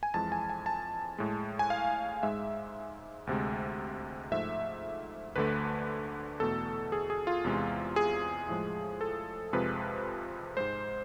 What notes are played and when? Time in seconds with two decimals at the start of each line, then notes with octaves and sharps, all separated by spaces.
0.03 G#5
0.14 F2 E3 G#3 A5
0.32 G#5
0.50 G#5
0.66 A5
1.18 A2 G#3
1.59 G#5
1.70 F5
2.23 G#2 G#3 E5
3.27 D2 C3 G#3
4.31 G#2 F3 A3 E5
5.36 D2 D3 A3 B4
6.40 E2 B2 A3 A4
6.92 G#4
7.10 G#4
7.27 F4
7.45 E2 C3 G#3
7.96 G#4
8.48 A2 F3 G#3
9.01 A4
9.53 F2 C3 F3 G#3 B4
10.57 G#2 G#3 C5